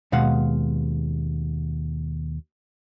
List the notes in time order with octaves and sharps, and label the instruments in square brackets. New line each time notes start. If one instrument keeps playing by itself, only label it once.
[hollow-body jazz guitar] D#2 B2 G#3 F5 F#5